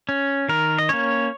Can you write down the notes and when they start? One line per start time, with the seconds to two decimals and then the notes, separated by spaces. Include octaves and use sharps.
0.09 C#4
0.49 D#3 A#4
0.78 D#5
0.89 A#3 C#4 C#5